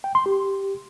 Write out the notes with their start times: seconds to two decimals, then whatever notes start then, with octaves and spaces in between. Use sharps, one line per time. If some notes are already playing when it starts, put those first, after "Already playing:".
0.04 G5
0.15 C6
0.26 G4